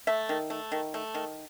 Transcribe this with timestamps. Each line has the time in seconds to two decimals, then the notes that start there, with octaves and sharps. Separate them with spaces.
0.07 A3 E5
0.29 D#3
0.50 A3
0.72 D#3
0.94 A3
1.14 D#3